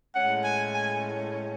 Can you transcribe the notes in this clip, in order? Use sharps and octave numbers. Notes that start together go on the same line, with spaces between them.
A2 G#3 C#4 F#5
G#5
G#5